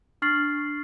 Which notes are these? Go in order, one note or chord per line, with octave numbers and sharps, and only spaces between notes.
D4 C#6 F6 A6 C7 F#7